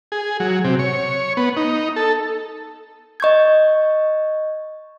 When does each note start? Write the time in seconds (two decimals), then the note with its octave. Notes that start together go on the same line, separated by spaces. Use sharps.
0.12 G#4
0.40 F#3
0.64 C3
0.79 C#5
1.37 B3
1.57 D#4
1.96 A4
3.20 D#5 C#6 G6 G#6